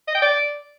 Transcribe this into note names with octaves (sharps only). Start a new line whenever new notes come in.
D#5
G5
D5